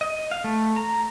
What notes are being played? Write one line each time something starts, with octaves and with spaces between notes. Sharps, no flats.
D#5
F5
A3
A#5